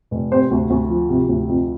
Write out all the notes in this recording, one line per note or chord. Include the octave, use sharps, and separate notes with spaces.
F1
C3 C5
D2
D2
F3
C3
D2
F2